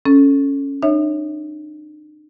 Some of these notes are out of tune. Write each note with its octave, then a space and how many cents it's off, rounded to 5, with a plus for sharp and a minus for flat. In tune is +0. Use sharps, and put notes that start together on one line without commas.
C#4 +0 A4 +0
D#4 -40 C#5 +0 E5 -20